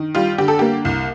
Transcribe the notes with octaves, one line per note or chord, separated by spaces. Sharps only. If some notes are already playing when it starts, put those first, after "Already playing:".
Already playing: D#3
G3 F4
D3 G4
A4
A#3 G4
C2